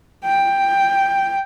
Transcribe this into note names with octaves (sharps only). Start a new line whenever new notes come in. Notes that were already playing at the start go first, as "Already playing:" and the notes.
G5